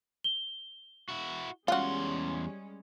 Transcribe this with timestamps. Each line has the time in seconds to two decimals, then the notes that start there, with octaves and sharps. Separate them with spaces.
0.24 G7
1.09 E4 F#4
1.68 E2 G3 G#3 C#4 F4 F#4 C6